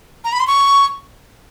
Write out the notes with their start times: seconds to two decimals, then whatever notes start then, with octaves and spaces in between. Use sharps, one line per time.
0.24 A#5
0.32 B5
0.40 C6
0.47 C#6